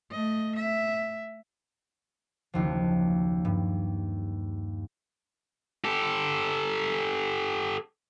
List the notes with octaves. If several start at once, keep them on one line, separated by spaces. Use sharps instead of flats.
A3 D#5
E5
F#1 D#2 F3
G2
G4 A4